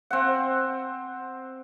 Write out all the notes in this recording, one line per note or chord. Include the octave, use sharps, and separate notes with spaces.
C4 F#5